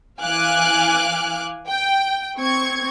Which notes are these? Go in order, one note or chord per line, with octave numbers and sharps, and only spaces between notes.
E3 F5 G#5 D6 F6 F#6
G5
C4 C#6 G#6